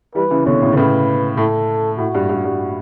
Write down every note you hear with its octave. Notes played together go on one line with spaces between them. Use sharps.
E3 G3 B4
C#3 E3
B2 D3 C#5
A2 C#3
D3
A2 C#3 B4
A2 A4
A2 F#4
G2
G2
G2